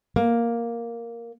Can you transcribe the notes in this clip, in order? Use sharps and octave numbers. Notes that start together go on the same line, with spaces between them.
A#3